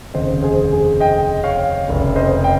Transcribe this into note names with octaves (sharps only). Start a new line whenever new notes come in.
F1 D#2 C#3 C5 D#5
G#4 C5
G#4
D#5 G5
C#5 F5
F1 F2 C#3
C5 D#5
G5